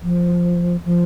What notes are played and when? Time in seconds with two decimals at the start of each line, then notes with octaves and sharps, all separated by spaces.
0.03 F3
0.85 F3